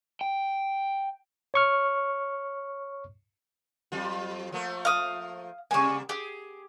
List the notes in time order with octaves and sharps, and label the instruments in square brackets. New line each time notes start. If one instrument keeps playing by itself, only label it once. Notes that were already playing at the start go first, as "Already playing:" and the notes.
[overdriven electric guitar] G5
[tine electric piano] C#5 C#6 F6
[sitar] F2 F#3 F4
F3 A3 A#3
[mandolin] F5 D#6
[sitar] C3 G3 A#3 [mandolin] G#5 C#6
[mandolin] G4 [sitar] G#4